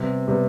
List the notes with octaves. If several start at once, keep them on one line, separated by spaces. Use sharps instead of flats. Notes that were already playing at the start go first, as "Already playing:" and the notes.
Already playing: C3 G3 B3
C3 G3 B3